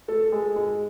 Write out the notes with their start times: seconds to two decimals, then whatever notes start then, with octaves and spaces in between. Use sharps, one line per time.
0.08 A3 A4
0.32 G#3 G#4
0.56 G#2 G#3 G#4